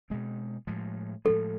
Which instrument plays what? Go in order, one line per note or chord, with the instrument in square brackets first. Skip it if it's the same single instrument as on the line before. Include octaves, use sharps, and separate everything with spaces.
[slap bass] B2 G#3 C4
A2 F3 G#3
[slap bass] A2 F3 G#3 [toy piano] A4